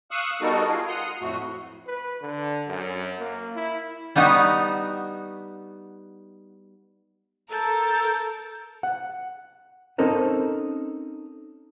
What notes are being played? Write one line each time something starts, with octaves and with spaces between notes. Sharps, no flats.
F5 C#6 D#6 E6 F#6
G3 B3 D#4 F#4 A4 A#4
F4 G#4
F#5 A#5 C6 D#6
F2 A2 A3 F#4
B4
D3
F#2
A#3
E4
G3 B3 D#4 F#4
A4 A#4 A5 G6
F#5
C4 C#4 D#4 A4 A#4 C5